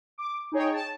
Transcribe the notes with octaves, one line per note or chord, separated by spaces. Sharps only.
D6
D#4 G#4 C#5 G5
A5